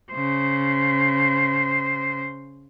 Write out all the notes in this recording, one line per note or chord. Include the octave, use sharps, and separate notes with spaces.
C#3 C5